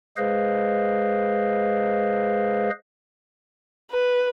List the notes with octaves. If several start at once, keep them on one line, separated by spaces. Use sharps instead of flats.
G#3 G#4 B4 C5 D#5 F5
B4